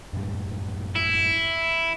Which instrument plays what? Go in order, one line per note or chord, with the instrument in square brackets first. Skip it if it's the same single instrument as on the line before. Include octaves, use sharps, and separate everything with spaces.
[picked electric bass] F#2 A2 G3
[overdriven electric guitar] E4